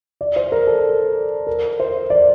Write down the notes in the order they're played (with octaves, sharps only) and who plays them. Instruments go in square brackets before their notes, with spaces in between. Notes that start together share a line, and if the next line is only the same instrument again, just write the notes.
[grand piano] D5
C5
A#4
A4
A#4
C5
D5